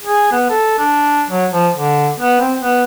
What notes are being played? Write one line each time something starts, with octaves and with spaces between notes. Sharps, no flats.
G#4
B3
A4
D4
F#3
F3
D3
B3
C4
B3